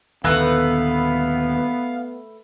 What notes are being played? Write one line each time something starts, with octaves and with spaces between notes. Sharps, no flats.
D#1 D#2 D3 A3 B3 B4 F5 A#5